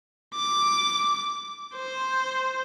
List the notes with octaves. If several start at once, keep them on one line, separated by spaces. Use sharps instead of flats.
D6
C5